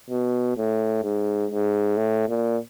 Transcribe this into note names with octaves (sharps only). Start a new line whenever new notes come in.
B2
A2
G#2
G#2
A2
A#2